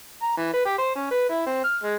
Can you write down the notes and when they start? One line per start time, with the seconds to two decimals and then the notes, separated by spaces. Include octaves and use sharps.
0.22 A#5
0.37 E3
0.53 B4
0.65 G4
0.78 C5
0.95 C#4
1.11 B4
1.30 E4
1.46 C4
1.64 F6
1.83 G#3